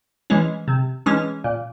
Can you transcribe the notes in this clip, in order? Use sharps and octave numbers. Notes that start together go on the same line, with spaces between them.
E3 G#3 C#4
C3
E3 G#3 C#4
A#2